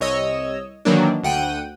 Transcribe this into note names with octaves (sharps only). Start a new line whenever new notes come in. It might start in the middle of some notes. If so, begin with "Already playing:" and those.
C2 C#5 D#5 E6
D#3 E3 F#3 A#3 D4
D2 F#5 G5 D#7